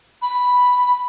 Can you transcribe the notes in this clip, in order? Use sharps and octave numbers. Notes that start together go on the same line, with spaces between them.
B5